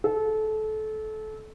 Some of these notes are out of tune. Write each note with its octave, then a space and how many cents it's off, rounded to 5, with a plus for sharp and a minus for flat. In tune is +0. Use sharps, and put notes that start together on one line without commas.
A4 -25